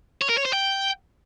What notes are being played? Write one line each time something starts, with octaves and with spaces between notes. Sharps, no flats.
C#5
A#4
C#5
C5
G5